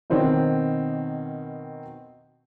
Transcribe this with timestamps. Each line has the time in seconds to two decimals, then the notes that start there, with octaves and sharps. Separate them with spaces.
0.10 B2 D#3 C4 C#4 D#4